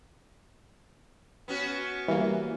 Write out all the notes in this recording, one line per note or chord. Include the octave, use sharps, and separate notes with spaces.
B3 C#4 F#4
E3 G3 A#3